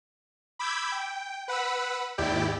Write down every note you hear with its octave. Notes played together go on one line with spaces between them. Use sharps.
B5 D6 E6 G6 G#6
G5
B4 F#5 B5 E6
D#2 G#2 E4 G4 D5 G5